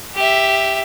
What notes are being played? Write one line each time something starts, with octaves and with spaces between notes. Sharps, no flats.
G4 E5